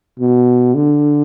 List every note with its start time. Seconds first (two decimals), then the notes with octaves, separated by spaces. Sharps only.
0.19 B2
0.74 D3